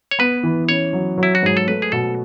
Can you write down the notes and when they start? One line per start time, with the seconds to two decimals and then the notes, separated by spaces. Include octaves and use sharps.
0.11 C#5
0.19 B3 B4
0.43 E3
0.68 C#4 C#5
0.93 F#3
1.18 F#3
1.23 E4
1.35 F#4
1.43 G#2 G#4
1.57 A4
1.67 A3 B4
1.82 G#4
1.92 B2 A4